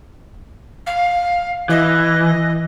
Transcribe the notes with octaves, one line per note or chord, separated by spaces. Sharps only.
F5
E3 D#5